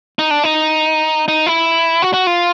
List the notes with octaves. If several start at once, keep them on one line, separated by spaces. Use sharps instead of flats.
D#4
D4
D#4
D#4
E4
F#4
F#4
F4